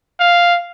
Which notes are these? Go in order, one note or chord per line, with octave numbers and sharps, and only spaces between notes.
F5